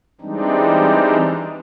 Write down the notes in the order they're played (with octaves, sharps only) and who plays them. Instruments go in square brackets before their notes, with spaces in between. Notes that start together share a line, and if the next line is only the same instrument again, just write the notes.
[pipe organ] E3 G3 G#3 C4 D4 D#4